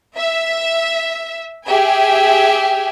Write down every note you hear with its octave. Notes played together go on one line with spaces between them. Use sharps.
E5
G4 G#4 E5 G#5